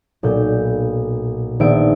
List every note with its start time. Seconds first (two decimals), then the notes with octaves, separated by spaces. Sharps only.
0.23 B1 A#2 G6
1.60 A#1 D#3 B3 E5 D7